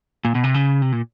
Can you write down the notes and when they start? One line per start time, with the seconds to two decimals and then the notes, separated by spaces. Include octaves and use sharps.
0.25 A#2
0.35 B2
0.44 C3
0.54 C#3
0.82 C3
0.92 A#2